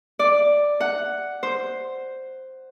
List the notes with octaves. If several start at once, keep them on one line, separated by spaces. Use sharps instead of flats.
D5
F#5
C5